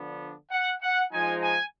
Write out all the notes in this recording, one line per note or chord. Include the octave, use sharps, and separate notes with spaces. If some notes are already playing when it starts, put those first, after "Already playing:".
Already playing: D3 F3 B3 D4
F#5
F#5
F3 G#3 D#4 G#5
G#5